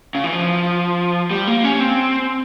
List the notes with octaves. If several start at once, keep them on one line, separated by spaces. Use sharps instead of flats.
C#3
E3
F3
G3
A#3
C#4
C4